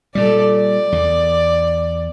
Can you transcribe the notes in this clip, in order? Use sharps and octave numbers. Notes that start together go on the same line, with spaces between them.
A#2 G3 A4 D5
D5
E2